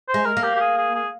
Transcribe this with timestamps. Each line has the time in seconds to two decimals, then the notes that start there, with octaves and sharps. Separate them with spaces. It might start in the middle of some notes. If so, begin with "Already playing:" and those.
0.08 C5
0.14 G#3
0.25 A#4
0.37 A#3
0.43 G4
0.56 G4
0.60 G#4
0.77 G#4
0.95 G#4